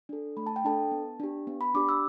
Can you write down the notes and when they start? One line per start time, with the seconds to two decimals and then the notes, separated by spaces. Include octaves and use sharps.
0.09 D4 A4
0.37 A3 B5
0.46 A5
0.56 G5
0.65 D4 A4 A5
0.92 B3
1.20 D4 G4
1.47 B3
1.61 B5
1.75 D4 G4 D6
1.89 E6